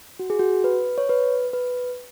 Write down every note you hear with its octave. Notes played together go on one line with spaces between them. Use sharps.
F#4
G#4
F#4
B4
C#5
B4
B4